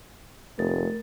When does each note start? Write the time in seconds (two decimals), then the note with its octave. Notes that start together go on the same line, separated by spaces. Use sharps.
0.58 F1 A3 A#4 A6